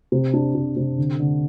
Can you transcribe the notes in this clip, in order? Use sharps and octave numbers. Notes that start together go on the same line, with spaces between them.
C3
D4
C3
C3
D3
D3